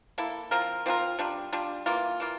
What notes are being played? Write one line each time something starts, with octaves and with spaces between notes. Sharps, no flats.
A#3 E4 A4
F3 C4 F4 A#4
F3 C4 F4 A#4
G3 D4 F4
G3 D4 F4
E3 A#3 F4
E3 A#3 F4